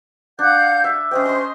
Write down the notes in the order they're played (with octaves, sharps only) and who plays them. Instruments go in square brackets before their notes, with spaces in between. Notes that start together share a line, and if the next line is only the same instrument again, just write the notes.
[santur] D4 [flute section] F5 F#5 G6
[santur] E5
[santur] C#4 D#5 G5 [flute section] C5
[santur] D#5 C6